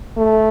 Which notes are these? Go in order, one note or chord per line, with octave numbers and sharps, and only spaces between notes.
A3